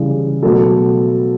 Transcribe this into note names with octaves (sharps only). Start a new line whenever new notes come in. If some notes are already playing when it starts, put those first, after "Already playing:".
Already playing: C#3 E3 G3 G#4
B2 F#3 A3 A4